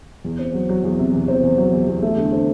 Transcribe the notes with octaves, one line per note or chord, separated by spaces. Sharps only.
E2
C4
F#3
F#3
E2
C3
E2
C4
E2
F#3
E2
E2
A3
D3
C4